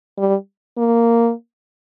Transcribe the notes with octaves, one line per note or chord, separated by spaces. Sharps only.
G3
A#3